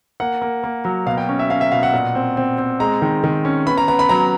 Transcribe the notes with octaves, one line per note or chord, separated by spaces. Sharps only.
A#3 F#5
A#3
A#3
F#3
B2 F5
G5
C#4
E5
C#4 F5
E5
B2 F5
F#5
A#2
C4
C4
C4
G#3 A#5
D#3
D#3
C#4
B3 B5
A#5
B3 A#5
B5
F#3 A#5